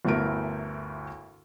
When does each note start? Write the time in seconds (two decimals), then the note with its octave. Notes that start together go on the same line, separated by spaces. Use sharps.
0.05 G1 D2 A3 E4 A#4 D7